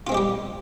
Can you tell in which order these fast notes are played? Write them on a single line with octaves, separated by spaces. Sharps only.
F4 C4 G#3 G4 G3